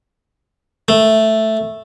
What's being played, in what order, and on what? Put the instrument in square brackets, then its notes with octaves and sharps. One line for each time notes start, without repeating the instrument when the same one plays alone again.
[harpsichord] A3